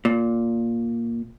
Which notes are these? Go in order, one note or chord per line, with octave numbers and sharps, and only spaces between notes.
A#2